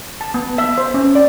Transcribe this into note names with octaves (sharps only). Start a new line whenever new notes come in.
A5
B3
E5
C5
C#4
D5